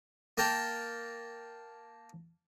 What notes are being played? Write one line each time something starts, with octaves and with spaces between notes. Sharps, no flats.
A#3 A#4 G5 A5